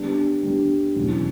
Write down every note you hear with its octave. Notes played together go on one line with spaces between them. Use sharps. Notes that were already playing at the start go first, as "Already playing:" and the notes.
Already playing: D3 G3 B3 D4
D3 G3 B3 D4
E2 B2 F#3 C#4